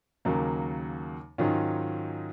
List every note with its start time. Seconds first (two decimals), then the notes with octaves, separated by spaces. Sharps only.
0.25 D#2 C#3 F#3 A#3
1.38 G#2 D#3 F#3 C#4 F4